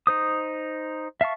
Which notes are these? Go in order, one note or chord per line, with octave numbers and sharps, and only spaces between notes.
D#4 C5 D#6
E5 F5 A5 C#6